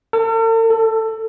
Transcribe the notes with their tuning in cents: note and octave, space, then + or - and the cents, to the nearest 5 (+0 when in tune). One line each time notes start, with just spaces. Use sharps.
A4 +45
A4 +15